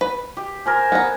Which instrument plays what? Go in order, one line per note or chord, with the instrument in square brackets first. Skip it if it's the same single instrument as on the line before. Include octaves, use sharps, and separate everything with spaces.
[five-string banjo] B4
[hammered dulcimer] G4
A#4 C5 G#5
[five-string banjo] B3 A#5